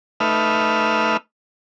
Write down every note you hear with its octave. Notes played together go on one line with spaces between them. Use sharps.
A3 D#4 B4 E5 F6